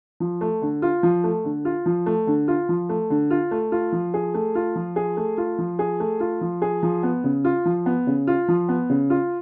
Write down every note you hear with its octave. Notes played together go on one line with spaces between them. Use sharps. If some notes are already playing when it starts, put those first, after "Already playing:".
F3
A3
D3
F4
F3
A3
D3
F4
F3
A3
D3
F4
F3
A3
D3
F4
A3
F4
F3
G#4
A3
F4
F3
G#4
A3
F4
F3
G#4
A3
F4
F3
G#4
F3
B3
C#3
F4
F3
B3
C#3
F4
F3
B3
C#3
F4